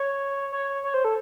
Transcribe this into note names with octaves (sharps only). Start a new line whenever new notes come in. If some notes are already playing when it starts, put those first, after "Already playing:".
Already playing: C#5
C#5
C#5
C5
A4